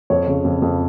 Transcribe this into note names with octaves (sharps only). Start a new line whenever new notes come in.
F2 C#5
C#3
F2
F2